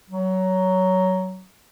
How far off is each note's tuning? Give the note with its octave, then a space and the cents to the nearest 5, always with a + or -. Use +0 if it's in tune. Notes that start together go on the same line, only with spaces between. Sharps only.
F#3 +15